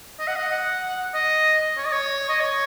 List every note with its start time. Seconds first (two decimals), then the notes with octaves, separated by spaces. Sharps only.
0.19 D#5
0.28 F#5
0.36 D#5
0.51 F#5
1.14 D#5
1.78 C#5
1.86 D#5
1.93 C#5
2.29 D#5
2.41 C#5